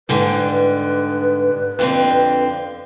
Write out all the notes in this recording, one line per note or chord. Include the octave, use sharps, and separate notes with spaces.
G#2 D3 G3 B4
F2 D3 C4